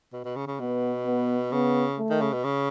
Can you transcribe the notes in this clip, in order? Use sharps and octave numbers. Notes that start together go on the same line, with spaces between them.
B2
B2
C#3
C#3
B2 B3
B3
C#3 B3
A3
D#3
C#3
B2
C#3